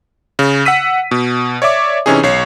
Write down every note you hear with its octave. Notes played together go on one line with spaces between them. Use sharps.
C#3
F#5 E6 B6 D#7
B2
C#5 D5 E5 D6
C3 E3 C#4 D#4 G#4
B1 C#5 C7